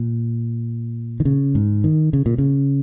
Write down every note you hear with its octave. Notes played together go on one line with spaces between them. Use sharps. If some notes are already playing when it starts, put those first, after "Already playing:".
Already playing: A#2
D#3
C#3
G#2
D#3
C#3
A#2
C#3